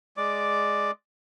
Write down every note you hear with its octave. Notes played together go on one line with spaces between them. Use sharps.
G#3 D5 D6